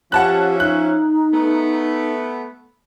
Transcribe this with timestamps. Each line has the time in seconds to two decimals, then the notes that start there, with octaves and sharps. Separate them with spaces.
0.12 F3 C#4 G4 E5 F#5 A5 F#6
0.60 D#4 F#6
1.32 A3 B3